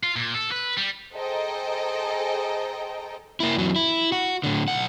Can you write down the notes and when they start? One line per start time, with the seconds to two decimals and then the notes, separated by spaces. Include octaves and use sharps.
0.03 F4
0.16 A#2
0.34 A4
0.51 B4
0.77 G3
1.15 G#4 A4 C5 D#5 G5 A#5
3.40 A#3 E4
3.57 E2 F#3
3.76 E4
4.12 F#4
4.43 A2 D3
4.68 B1 F#5